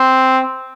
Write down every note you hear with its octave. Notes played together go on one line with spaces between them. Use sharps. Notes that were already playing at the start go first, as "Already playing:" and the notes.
Already playing: C4